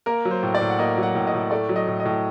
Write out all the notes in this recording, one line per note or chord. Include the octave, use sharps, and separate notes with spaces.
A#3 A#4
F#3
C5
A2
D5
A2
F#5
A#3 D#5
F#3
F#5
A2
D#5
A2
A3 D5
F#3
D#5
A2
D#5
A2